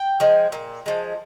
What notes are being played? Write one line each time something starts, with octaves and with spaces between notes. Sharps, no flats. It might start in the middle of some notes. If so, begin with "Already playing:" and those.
Already playing: G5
F3 G#3
A#2
F3 G#3